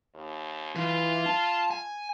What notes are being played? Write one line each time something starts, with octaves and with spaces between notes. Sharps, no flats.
D#2
E3 F4
A5
G#5